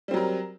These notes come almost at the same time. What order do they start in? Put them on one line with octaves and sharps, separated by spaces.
G3 C4 F#3 A#4